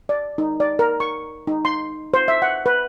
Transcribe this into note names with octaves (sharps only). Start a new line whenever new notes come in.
D5
D#4
D5
A#4
C#6
D#4
C6
C5
E5
F#5
B4